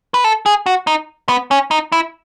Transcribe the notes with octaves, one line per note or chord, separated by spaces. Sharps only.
B4
A4
G#4
F#4
D#4
B3
C#4
D#4
E4